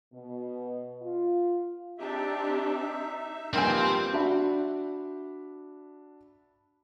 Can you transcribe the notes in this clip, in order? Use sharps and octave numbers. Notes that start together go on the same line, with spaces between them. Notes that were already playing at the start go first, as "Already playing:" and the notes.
B2
F4
C4 D4 D#4 G4 E5
D#3 F3 G3 A#3 C4 B4 C5 G#5
D4 F#4 E5 B5